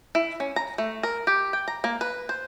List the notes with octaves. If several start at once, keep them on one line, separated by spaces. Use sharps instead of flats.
E4
C#4
A#5
A3
A#4
G4
G5
A#5
A#3
B4
C5